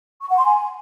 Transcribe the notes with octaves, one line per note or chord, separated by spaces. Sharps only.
C#6
F#5
C6
G#5